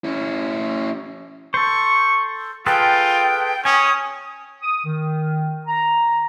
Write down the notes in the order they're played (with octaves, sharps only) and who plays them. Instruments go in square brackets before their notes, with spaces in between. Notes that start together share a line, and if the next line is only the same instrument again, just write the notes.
[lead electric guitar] C#4 E4
[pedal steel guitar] A4 C5 [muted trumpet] C#6
[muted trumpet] F4 [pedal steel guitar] G#4 A4 B4 [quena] G5
[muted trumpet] C#4 [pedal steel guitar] G#5 [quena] D#6
[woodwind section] D#6
D#3
A#5